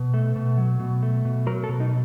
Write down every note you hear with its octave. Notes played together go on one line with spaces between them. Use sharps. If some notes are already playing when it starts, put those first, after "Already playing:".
Already playing: B2
A3
B2
F#3
B2
A3
B2
F#3 A#4
A4
B2
D#4